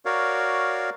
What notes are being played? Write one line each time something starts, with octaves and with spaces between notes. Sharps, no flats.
F#4 A#4 C#5 D5 F5